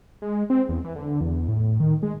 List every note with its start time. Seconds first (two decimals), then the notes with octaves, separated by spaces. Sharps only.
0.22 G#3
0.50 C4
0.69 E2
0.84 E3
0.96 D3
1.21 E2
1.48 A2
1.80 D#3
2.03 G#3